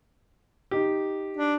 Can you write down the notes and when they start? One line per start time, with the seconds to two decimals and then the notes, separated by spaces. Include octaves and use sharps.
0.71 D#4 G4
1.37 D4